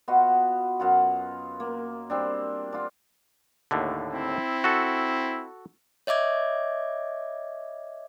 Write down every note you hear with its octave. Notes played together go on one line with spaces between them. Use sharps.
B3 F4 F#4 D#5
F#2 F4 F#5
A#3
G3 C4 D4
D4 F4
D#2 A2 D3
C4 E4
F#4 A4
C#5 D#5 E5 D6 G#6